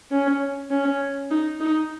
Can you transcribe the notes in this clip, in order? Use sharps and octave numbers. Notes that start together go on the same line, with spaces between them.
C#4
C#4
D#4
D#4